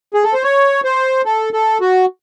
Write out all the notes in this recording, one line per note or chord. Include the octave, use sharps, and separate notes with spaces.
G#4
A4
C5
C#5
C5
A4
A4
F#4